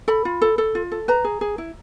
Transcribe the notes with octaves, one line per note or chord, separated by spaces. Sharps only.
A4 B5
F4
A4
A4
F4
A4
B4 A#5
G#4
G#4
E4